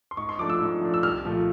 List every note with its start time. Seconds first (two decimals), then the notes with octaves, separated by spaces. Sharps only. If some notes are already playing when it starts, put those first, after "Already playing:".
0.11 C6
0.17 G#2 C#6
0.29 C6
0.39 F3 A3 D4 D6
0.50 E6
0.61 G#2
0.81 F3 A3 D4
0.94 E6
1.03 C2 F6
1.25 A#2 F3 A3